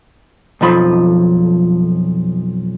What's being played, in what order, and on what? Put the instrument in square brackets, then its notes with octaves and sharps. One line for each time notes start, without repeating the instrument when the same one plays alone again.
[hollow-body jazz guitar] B1 F2 F3 B5